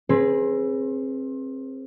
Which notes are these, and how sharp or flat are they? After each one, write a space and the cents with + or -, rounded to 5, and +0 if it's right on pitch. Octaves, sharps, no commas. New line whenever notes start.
C4 +25 G#4 +0 B4 -15